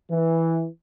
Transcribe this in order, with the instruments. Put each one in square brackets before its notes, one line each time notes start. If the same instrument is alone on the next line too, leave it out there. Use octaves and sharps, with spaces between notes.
[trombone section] E3